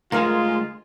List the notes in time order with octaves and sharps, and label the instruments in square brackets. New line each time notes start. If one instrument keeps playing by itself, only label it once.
[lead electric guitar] D2 G#3 [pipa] A#3 G#4 A#4 [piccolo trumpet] F4